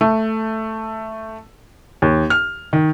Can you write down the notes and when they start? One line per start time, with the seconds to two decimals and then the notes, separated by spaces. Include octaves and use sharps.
0.01 A3
2.02 D#2
2.30 F6
2.73 D#3